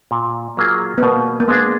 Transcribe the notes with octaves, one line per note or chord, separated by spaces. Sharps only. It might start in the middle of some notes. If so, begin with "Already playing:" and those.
A#2
F#3 A#3 F4 G#4
B3
B2 A#3
A#3
G#3 B3 D4 G#4